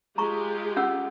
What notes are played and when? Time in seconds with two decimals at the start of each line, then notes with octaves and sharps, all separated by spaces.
0.18 G#3 F4 G4 A#5 C#6
0.77 C#4 F#5 E6